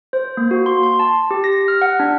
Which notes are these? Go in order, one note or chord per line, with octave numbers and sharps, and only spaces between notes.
C5
A#3
F#4
C6
C6
A5
G4
A#6
F6
F#5
D4